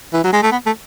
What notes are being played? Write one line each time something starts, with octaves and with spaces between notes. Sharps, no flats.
E3
F#3
G#3
A3
B3
A3